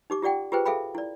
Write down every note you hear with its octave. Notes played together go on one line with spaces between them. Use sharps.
D#4 G4 D6
F4 G4 D5 F#5 G5
F4 G4 G#4 B4 C5 G5
G#4 A4 E5 F5 G5 B5
E4 D5